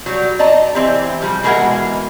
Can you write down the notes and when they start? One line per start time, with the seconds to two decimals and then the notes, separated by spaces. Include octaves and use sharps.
0.06 F#3 G3
0.39 D5 D#5 A5 A#5
0.75 E3 C4 G4
1.22 F3 G3
1.43 B2 E3 G#3 G#4 A#4 F#5